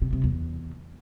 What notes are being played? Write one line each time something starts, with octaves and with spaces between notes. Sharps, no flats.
C3
C3
E2